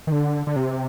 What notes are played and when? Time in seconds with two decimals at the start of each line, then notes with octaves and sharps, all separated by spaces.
0.07 D#3
0.12 D3
0.47 D3
0.56 C3